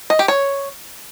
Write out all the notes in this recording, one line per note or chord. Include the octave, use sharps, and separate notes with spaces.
D#5
G4
C#5